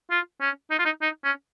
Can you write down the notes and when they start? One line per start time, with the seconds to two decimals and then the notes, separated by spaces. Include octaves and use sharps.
0.10 F4
0.41 C#4
0.71 D#4
0.79 F4
0.85 D#4
1.02 D#4
1.24 C#4